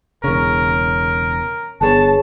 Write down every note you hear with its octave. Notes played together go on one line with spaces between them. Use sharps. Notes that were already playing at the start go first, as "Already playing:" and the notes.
E1 C#3 C#4 A#4
G1 B3 G#4 C#5 A5